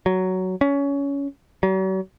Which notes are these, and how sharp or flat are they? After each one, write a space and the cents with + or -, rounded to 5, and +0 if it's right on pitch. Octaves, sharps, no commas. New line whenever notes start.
F#3 +10
C#4 +20
F#3 +45